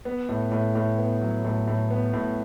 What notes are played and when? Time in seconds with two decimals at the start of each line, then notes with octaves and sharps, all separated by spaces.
0.05 B3
0.29 A2
0.51 A2
0.75 A2
0.98 B3
1.21 F#3
1.44 A2
1.67 A2
1.90 B3
2.13 A2